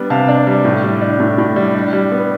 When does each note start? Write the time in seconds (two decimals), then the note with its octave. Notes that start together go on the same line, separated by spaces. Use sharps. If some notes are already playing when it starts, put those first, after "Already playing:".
Already playing: G3 B3 D4
0.10 C3 F5 A5
0.28 D4
0.47 G3
0.65 A2
0.83 G3
1.01 D4
1.19 A2
1.38 A2
1.56 G3
1.75 D4
1.93 G3
2.12 B3